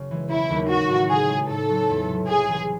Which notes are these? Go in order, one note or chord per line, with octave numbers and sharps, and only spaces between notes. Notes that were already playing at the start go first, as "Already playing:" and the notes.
Already playing: F#1 C#3
E3 G#3
E1 E4
D#2 D#3 F#3 A3
A1 F#4
A2 G#3 D#4 A4
C#3 G#4
G#3 D#4
A2 A4
F#3 C4
E2
C3
F#3
C2 G#4
C3 E3